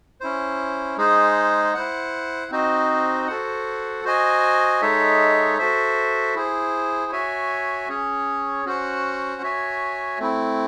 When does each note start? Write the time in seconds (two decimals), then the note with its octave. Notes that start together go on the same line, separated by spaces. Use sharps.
0.21 C#4 E4 C5
0.97 G#3 D#4 G#4 C5 D#5
1.74 E4 C5 F#5
2.50 C4 D#4 F#4 C5 D#5
3.28 F#4 A4 C5 F#5
4.04 F#4 C5 D#5 G#5
4.81 G#3 D#4 A4 C#5 E5
5.58 F#4 A4 C5 E5
6.35 E4 G#4 C5
7.12 F#4 C#5 E5 G#5
7.89 C#4 G#4 C#5
8.66 C#4 F#4 C5 F#5
9.42 F#4 C#5 E5 G#5
10.19 A3 C4 E4